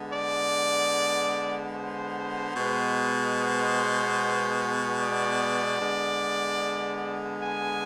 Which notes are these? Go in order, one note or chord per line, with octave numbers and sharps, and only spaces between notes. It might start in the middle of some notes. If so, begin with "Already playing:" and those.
Already playing: D3 G#3 B3
D5
C5
B2 G#3 B3
C5
D5
D3 G#3 B3
G#5